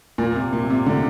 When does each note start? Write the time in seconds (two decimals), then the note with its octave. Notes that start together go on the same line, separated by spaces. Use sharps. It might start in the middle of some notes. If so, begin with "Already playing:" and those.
0.18 A#2
0.35 C3
0.53 A#2
0.70 C3
0.86 D3